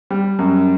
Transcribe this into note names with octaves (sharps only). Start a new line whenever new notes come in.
G3
F#2